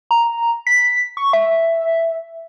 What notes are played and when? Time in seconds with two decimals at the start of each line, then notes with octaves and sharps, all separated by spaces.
0.11 A#5
0.67 B6
1.17 C#6
1.33 E5